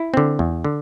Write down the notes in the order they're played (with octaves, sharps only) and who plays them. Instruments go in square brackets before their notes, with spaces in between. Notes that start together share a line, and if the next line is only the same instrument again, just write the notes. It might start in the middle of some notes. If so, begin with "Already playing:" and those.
Already playing: [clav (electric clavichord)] E4
D3 C4
E2
D3